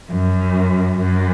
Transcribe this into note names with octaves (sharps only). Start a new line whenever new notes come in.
F#2
F#2